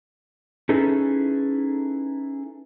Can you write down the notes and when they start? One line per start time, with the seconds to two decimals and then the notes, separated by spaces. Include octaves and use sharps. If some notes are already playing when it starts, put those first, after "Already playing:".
0.69 C#4 D#4 E4 G#4 A4 B4